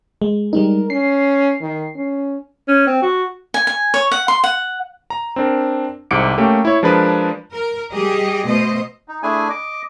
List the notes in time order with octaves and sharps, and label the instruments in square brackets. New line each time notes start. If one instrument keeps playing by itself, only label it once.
[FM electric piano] G#3
[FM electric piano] G3 G#3 D#4 [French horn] A#4
[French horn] C#4 [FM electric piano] C7
[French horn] D#3
C#4
[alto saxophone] C#4
C4
F#4
[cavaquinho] G#5
G#5
C#5
F#5
C6
F#5
[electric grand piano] A#5
C4 D4 A#4
C2 G#2 C3 D6 C#7 D7
A3 A#3 C#4 G4
E4 C#5
F3 G#3 D4 A#4 B4
[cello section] A#4
G3 G4 G#4 D#5
B2 A3 C5 D#5
[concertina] D#4
A3 D4 E4 G#4 G#5
D#5 D6